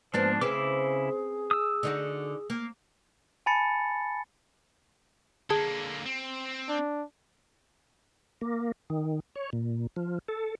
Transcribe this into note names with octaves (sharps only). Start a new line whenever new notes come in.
G#2 F3 A#3 B3 D4 C5
C#3 C4 C#4 E4 G#4 B4 D6
D#6 E6
D3 D#4 F#4
A#3
G#5 A5 B5 A6 C#7
D3 A#3 G#4 A5 G#6
C4
D4
A#3
D#3
C#5
A#2
F3
A4